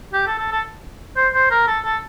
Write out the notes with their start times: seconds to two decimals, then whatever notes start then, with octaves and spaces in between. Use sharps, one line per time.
0.13 G4
0.27 A4
0.39 A4
0.52 A4
1.17 C5
1.34 C5
1.51 A#4
1.68 A4
1.85 A4